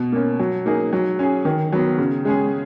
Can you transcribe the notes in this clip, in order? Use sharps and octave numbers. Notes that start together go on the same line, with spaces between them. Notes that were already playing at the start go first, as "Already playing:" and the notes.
Already playing: B2
A#3 C#4
F#3
A#3 D#4 G#4
F#3
C#4 G#4
D#3
F#3 B3
C#3
G#3 C#4 G#4